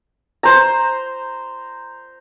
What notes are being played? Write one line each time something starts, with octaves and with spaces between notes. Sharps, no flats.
C5 A#5